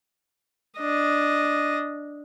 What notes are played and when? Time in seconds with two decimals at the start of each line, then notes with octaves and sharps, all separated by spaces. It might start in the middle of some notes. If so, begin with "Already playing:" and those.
0.79 D4 D#5